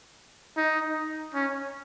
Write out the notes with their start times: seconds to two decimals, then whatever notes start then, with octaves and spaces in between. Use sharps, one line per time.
0.57 D#4
1.34 C#4